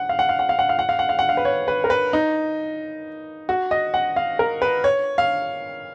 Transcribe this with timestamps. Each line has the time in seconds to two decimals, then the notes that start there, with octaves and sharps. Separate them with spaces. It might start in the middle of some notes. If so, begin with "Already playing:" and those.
Already playing: F#5
0.09 F5
0.19 F#5
0.29 F5
0.39 F#5
0.49 F5
0.59 F#5
0.69 F5
0.79 F#5
0.89 F5
0.99 F#5
1.09 F5
1.19 F#5
1.29 F5
1.37 B4
1.45 C#5
1.68 B4
1.84 A#4
1.90 B4
2.13 D#4
3.49 F#4
3.71 D#5
3.94 F#5
4.16 F5
4.39 A#4
4.62 B4
4.84 C#5
5.18 F5